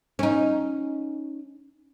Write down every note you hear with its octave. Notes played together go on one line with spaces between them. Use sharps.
C#4 D#4